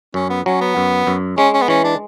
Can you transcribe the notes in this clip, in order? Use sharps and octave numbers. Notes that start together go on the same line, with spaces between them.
F#2 C#4
B3
F#3 C#4
B3
F#2
F#2
G#3 C#4
C#4
B3
E3 C#4
D4